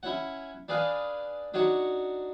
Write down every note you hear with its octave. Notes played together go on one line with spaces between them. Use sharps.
C#4 E4 C#5 F#5
D4 G#4 B4 D5 F5
D4 D#4 F#4 C#5 C#6